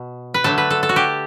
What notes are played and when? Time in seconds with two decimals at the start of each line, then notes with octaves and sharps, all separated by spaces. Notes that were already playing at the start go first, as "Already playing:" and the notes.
Already playing: B2
0.34 B4
0.44 D3 F#3 A3 A4
0.58 B4
0.70 A4
0.83 A4
0.89 F#4
0.96 G4